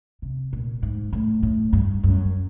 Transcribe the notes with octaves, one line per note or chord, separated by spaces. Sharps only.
C3
A#2
G#2
A2
A2
G2
F#2